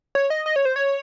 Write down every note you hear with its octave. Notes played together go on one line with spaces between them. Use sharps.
C#5
D#5
D#5
C#5
C5
C#5